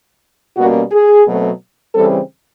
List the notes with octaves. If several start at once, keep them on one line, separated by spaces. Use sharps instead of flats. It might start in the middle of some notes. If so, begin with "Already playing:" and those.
B2 G3 A#3 C#4 F#4
G#4
B2 F#3 A3 C4
C#3 E3 G3 C4 A4